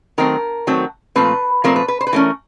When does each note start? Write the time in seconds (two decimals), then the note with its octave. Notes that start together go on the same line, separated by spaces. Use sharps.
0.18 D#3 F#3 A3 C4 A#4
0.67 D#3 F#3 A3 C4
1.15 A#2 F3 A3 C4 B4
1.64 A#2 F3 A3 C4 A#4
1.76 B4
1.88 B4
2.01 C5
2.07 B4
2.13 E3 A3 C#4 A#4